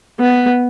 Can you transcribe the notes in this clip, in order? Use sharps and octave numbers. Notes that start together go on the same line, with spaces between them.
B3